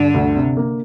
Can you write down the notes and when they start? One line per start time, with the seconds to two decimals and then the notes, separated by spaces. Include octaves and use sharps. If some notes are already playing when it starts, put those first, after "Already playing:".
Already playing: G2 D3
0.14 D2
0.36 C3
0.57 A#3